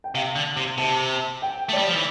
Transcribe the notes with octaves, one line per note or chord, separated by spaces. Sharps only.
G5
C3 F5
D3
C3
C3 A5
G5
A3
G3 D5
F3
E3